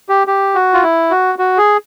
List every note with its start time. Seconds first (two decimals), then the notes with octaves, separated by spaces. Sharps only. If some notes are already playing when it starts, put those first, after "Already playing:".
0.09 G4
0.27 G4
0.55 F#4
0.74 F4
0.83 E4
1.11 F#4
1.39 F#4
1.58 G#4